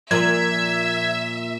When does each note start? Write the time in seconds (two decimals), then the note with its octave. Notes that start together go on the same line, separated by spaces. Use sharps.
0.11 A#2 F3 E5 G#6